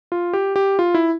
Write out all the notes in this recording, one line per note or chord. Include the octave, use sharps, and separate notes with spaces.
F4
G4
G4
F4
E4